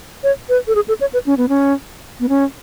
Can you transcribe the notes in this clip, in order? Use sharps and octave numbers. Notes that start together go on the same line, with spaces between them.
C#5
B4
A4
G#4
A4
C#5
B4
C#4
B3
C#4
B3
C#4